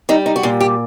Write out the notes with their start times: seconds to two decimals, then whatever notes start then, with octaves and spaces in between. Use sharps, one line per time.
0.09 G3 D#4
0.26 D#4
0.36 F#4
0.43 A#2 F4
0.60 G4